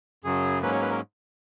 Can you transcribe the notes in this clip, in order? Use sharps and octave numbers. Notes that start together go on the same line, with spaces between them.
F#2 C#3 F#3 G#4
G#2 F#3 A#3 C#4 B4
C#5
B4
A#4